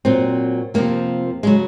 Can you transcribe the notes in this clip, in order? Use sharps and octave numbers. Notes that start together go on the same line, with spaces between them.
A#2 F#3 C4
F2 C3 F3 A#3
C#3 F#3 G#3